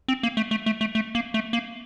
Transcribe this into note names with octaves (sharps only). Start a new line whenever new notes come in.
C4
A#3
A3
A3
A3
A3
A3
A#3
A3
A#3